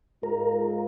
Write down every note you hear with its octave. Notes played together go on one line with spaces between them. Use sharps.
G#2 G#3 F4 A#4